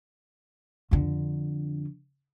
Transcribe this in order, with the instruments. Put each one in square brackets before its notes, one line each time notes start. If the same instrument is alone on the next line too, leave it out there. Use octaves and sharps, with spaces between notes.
[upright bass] F2 D3